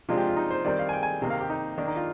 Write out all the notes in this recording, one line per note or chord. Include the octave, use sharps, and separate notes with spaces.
C3 F3 G#3 D4 F4
G4
F4
D#4
C5
D#3 G3 C4 D5
F5
G#5
G5
G#5
C3 D#3 A#3
F5
G4
D#4
D#3 A#3 D4
D#4
F4